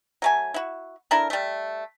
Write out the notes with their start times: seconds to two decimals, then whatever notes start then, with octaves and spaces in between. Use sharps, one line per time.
0.22 F#3 A3 G#5
0.54 E4 F#4
1.11 D4 E4 A4 A#4
1.30 G3 A3